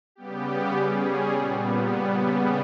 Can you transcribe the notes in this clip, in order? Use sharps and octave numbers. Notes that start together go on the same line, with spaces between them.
C#3 G3 B3 G4
G3 C#4 G#4
A#2 G3 B3
C#3 G3 B3